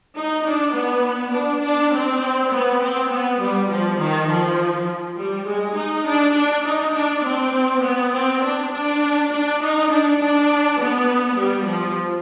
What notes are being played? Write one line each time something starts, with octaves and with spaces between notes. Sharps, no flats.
D#4
D4
B3
D4
D4
C4
B3
C4
B3
G3
F3
D#3
F3
G3
G#3
D#4
D4
D4
D#4
D4
C4
B3
C4
D4
D4
D4
D#4
D4
D4
B3
G3
F3